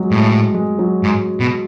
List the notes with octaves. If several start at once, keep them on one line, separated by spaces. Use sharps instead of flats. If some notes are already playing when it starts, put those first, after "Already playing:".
Already playing: F#3 G#3
A2 G#3
G#3
F#3
G#2
B2